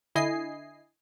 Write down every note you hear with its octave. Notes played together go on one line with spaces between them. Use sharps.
D3 E4 D#5 G#5 C7